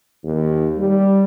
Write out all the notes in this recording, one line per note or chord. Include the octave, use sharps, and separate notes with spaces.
D#2
G3